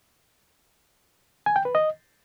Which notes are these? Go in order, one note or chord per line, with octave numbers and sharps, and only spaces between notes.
G#5
G5
B4
D#5